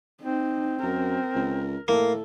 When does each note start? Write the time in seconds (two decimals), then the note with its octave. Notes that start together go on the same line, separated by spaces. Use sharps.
0.22 C4 D#4
0.83 F#2 A#4
1.35 C#2
1.88 A2 A#3 A4